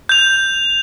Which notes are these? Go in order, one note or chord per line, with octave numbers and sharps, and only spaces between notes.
G6 F7